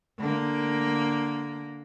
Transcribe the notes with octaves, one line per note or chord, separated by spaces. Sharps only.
D3 A#3